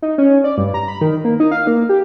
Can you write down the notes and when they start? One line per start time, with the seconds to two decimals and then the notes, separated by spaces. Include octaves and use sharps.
0.02 D#4
0.18 C#4
0.44 D5
0.58 G2
0.74 A#5
0.88 B5
1.01 D#3
1.25 A#3
1.40 D#4
1.51 F5
1.67 A#3
1.89 G4